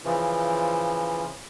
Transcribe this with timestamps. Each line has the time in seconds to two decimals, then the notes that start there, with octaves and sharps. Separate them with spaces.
0.05 C#3 E3 F3